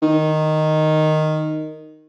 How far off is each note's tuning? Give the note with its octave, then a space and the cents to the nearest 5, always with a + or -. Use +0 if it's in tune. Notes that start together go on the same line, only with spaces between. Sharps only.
D#3 -5